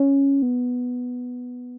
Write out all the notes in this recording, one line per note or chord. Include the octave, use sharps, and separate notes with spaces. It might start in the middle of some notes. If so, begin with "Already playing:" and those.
Already playing: C#4
B3